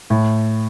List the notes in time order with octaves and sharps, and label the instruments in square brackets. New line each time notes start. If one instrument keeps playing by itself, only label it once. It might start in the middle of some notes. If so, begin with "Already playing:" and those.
[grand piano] A2